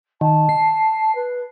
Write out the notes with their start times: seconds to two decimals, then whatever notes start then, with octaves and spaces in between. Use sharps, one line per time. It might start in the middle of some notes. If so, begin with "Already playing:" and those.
0.21 D#3 A5
0.49 C7
1.15 B4